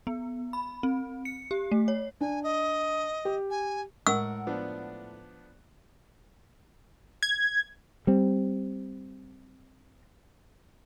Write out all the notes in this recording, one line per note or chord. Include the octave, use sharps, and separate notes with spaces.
B3
B5
C4
C#7
G4
A3
C#5
D4 G#5
D#5
G4
G#5
A2 G#3 A#4 F#5 C#6 E6
F3 B3 D4
G#6
G3 C4